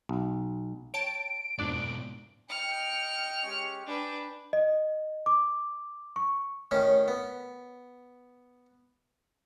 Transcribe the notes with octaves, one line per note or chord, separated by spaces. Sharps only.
B1
C#5 G5 A5 D7
F2 G#2 B2 D4 D5
D#5 G5 F6 C#7
G#3 C#4 G4
D4 B4 G5 G#5 D6
D#5
D6
C#6
A2 D#3 C#4
B3